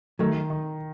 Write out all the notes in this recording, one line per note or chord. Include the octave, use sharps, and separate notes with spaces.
D#3 F#3 A3
D#3